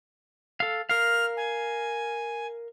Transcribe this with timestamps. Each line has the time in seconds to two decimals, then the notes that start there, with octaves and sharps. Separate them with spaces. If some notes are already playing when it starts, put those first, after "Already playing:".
0.60 A4 F5
0.89 A#4 F5 F6
1.37 G#5